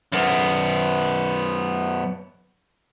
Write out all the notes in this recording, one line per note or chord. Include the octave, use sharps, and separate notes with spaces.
F#2 B3